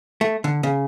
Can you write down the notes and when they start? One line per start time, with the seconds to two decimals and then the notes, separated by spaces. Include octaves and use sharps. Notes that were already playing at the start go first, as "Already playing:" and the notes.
0.21 A3
0.44 D3
0.63 C#3